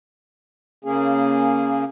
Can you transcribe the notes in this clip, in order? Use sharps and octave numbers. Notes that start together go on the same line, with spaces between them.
C#3 A#3 C#4 G#4